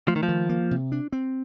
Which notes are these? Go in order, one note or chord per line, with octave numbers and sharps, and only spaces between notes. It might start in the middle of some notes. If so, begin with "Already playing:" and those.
F3 A3
D#3
F3
D#3
A#3
C3
D4
C4